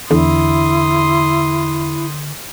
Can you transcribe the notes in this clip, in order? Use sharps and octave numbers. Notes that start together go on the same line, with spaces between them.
E2 D3 E4 C6 D#6